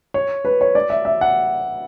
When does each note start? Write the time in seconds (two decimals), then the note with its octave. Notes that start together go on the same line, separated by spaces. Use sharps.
0.14 C#5
0.45 B4
0.61 C#5
0.75 D5
0.90 E5
1.05 E5
1.21 F#5